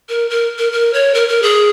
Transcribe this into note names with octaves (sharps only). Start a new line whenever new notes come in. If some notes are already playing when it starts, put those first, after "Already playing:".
A#4
A#4
A#4
A#4
C#5
A#4
A#4
G#4